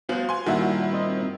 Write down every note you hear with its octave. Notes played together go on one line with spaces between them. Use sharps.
B3 F#4 C5 F5
G#5 C6
G2 A#2 D#3 E4 F#4 E5 F#5
C4 C5 D#5